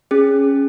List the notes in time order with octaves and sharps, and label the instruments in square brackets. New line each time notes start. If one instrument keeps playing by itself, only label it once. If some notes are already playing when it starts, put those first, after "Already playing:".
[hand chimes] C#4 G#4